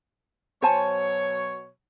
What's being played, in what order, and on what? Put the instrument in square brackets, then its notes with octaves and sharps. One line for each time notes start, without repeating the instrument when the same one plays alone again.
[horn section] B2 F#3 C#5 [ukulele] C5 G#5 A5